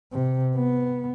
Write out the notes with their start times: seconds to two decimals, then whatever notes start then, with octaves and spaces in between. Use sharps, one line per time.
0.13 C3
0.56 B3